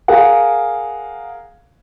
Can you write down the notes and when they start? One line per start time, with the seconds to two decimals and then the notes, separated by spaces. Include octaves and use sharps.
0.08 G#4 A#4 F5 F#5